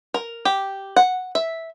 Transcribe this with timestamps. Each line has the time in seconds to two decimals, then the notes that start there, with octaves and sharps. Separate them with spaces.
0.14 A#4
0.45 G4
0.96 F#5
1.35 E5